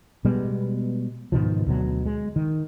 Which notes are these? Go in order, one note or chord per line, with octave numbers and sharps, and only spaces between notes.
B2 G3 G#3 B3
G#2 B2 D#3 F3
D2 B2 F#3
G#3
D#3